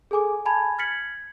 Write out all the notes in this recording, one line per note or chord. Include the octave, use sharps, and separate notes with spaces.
G#4 A4 G#5 D6
G#5 A5 B5 G#6
F6 G#6 A6 B6 C#7 F#7